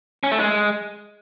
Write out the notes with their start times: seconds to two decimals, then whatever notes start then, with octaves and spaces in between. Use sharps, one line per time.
0.24 C#4
0.32 A3
0.40 G#3